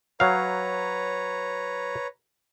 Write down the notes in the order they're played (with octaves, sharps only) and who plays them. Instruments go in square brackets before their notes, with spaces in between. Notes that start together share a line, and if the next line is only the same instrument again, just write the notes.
[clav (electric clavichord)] F#3 F5 [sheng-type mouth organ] B4 C#5 A#5